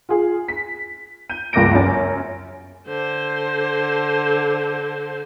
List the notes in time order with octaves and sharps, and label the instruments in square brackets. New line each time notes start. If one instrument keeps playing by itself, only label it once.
[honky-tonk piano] F4 G#4
B6
G6 D#7
C#2 G2 A#3 D6 A#6 D7
F#2 C#4 A6
[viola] D3 C5